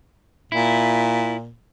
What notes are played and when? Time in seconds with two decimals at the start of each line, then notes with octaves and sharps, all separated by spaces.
0.52 A#2 E4